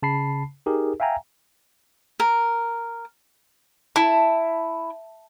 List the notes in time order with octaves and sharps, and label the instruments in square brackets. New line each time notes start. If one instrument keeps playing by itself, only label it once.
[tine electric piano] C#3 A5 B5 C7
D#4 G4 G#4 A#4
E5 F5 G5 G#5 A#5
[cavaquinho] A#4
[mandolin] E4 [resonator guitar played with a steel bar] A5